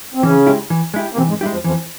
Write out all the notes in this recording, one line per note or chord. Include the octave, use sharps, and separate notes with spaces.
C4
C#3 E3 C#4
G#3 E4 G4
E3
G#3 E4 G4
A#3
C3 E3 C4
G#2 G#3
G2 G3 G#3 E4 G4
F2 F3
F2 E3 F3